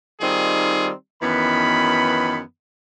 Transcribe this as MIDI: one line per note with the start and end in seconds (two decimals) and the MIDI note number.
0.21 0.89 51
0.21 0.89 55
0.21 0.89 60
0.21 0.89 63
0.21 0.89 65
0.21 0.89 68
1.22 2.39 42
1.22 2.39 51
1.22 2.39 52
1.22 2.39 59
1.22 2.39 83